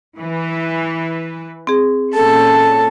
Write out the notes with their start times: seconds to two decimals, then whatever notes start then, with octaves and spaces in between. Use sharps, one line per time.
0.19 E3 B4
1.67 C4 G#4
2.15 A#2 C#4 A4 A5